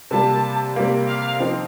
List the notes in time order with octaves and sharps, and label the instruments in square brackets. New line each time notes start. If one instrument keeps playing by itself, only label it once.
[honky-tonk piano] C3 G3 A#3 [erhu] A5
[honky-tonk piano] C3 G3 A#3
[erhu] F5
[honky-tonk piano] F3 C4 D#4